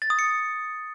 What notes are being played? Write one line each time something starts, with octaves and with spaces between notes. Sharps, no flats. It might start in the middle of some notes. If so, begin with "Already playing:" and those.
A6
D#6
C#7